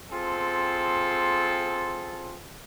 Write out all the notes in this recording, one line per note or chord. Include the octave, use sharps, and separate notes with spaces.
C4 F4 G#4 A4